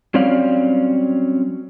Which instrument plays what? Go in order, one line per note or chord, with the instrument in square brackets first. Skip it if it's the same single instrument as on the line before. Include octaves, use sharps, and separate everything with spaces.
[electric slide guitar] F#3 G3 C4 C#4 D5 F5